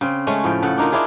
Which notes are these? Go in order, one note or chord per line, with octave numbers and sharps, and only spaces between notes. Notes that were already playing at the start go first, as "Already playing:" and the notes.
C#3 C4
G#3 A3 C#4
A2 F3 G5
C#3 A4 F#5
D4 D#4 F4 A#4
D4 E4 F4 G#4